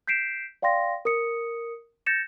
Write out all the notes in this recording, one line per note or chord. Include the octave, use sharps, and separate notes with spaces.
G6 B6 C7 D7 E7
D5 F5 G5 C6 A#6
A#4 D#6 C#7
G6 A6 A#6 C#7 E7